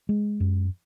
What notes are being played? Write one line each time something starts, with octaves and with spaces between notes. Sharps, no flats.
G#3
F#2